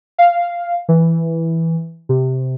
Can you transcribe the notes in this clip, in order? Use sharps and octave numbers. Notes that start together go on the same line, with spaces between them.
F5
E3
C3